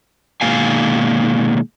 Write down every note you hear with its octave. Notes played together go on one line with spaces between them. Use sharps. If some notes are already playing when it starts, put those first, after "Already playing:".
B2 D#3 G#3 A#3 F5 G#5